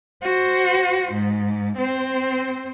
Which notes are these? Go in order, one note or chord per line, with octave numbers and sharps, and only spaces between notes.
F#4 C5
G#2
C4 C5